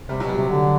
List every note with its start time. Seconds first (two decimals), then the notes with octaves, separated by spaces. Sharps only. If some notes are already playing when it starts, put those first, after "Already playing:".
0.09 C3 G3
0.20 B2 F#3
0.29 G3
0.36 C3
0.50 D3